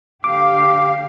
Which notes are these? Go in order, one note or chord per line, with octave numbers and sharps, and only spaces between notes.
D3 G4 F5 D6